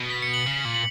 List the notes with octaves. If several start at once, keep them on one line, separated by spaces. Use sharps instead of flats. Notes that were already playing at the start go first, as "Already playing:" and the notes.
Already playing: B2
B6
C#7
F#7
C#3
A#2
F#7